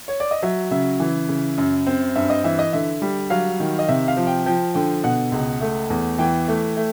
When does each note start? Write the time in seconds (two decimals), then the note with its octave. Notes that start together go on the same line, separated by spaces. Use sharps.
0.08 C#5
0.20 D5
0.31 D#5
0.43 F#3 E5
0.71 C#3 E5
1.00 E3
1.29 C#3
1.58 F#2
1.87 C4
2.15 G2 E5
2.30 D#5
2.44 E3 E5
2.59 D#5
2.73 D3 E5
3.02 G3
3.30 F#3 F5
3.60 D#3
3.79 D#5
3.88 C3 E5
4.08 F5
4.17 F3
4.27 G5
4.46 F3 G5
4.74 D3 G5
5.04 B2 F#5
5.32 C#2
5.61 A3
5.90 E2
6.18 E3 G5
6.48 A3
6.77 A3